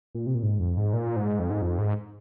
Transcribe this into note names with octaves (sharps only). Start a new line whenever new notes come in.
A#2
C3
A#2
G#2
F2
G#2
A#2
G#2
F2
G#2
F2
G#2